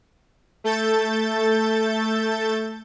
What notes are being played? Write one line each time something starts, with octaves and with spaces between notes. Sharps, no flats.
A3 A4 G6 A6